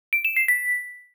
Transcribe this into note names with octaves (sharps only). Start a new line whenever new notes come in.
D7
E7
C7
B6